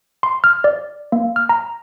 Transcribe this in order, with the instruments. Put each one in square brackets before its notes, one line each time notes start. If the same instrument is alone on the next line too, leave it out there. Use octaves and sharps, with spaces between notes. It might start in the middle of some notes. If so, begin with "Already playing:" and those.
[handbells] C6
F6
D5
A#3
F6
A#5